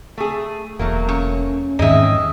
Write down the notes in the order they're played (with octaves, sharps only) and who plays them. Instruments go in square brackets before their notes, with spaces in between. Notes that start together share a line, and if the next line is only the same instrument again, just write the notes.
[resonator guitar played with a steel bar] A3 G#4
[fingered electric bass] E1 [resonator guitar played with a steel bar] F#3 A3 A#3
[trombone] C#4 [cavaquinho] C#6
[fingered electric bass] E2 G#2 D#3 [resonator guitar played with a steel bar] G#3 C4 [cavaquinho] D#5 E5